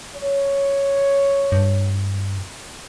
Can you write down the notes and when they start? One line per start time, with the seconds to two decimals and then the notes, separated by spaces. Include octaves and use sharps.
0.16 C#5
1.52 G2